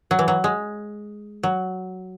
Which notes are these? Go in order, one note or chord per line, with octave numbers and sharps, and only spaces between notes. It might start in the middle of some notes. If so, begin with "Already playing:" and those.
F#3
E3
F#3
G#3
F#3